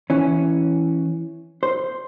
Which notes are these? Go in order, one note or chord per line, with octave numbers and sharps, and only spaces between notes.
E3 C#4
C5